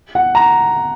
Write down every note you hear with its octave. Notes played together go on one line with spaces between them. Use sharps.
F#5
A#5